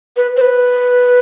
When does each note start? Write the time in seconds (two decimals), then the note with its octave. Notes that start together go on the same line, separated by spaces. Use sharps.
0.17 B4
0.37 C5
0.41 B4